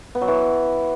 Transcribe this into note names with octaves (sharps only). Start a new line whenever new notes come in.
B3
F#3
E3